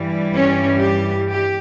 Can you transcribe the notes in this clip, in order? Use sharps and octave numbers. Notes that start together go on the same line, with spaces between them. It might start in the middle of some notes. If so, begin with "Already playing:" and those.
Already playing: G2 E3 G3
C#4
G4
G4